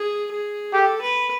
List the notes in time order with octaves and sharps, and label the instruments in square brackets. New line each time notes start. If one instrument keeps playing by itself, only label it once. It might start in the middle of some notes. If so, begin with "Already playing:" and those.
Already playing: [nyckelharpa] G#4
G#4
[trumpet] G4 [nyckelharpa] A4
[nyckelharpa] B4